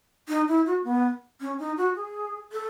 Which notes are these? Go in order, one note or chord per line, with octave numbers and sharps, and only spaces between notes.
D#4
E4
F#4
B3
C#4
D#4
F#4
G#4
A4